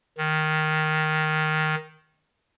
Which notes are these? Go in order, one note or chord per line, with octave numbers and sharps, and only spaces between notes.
D#3